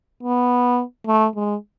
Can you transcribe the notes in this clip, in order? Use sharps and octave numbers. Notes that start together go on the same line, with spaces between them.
B3
A3
G#3